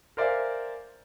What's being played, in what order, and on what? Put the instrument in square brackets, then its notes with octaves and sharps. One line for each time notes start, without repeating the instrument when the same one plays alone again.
[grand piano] A#4 C5 D5 E5 F5 G#5